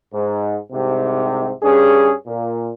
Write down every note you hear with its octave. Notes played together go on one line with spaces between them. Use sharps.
G#2
C2 G#2 C3
G2 C#4 G#4
A#2